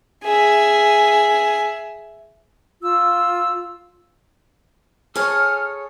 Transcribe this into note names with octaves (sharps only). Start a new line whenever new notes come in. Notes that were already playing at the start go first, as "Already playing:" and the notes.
G#4 E5
F4 E6
G#4 A4 C#5 F6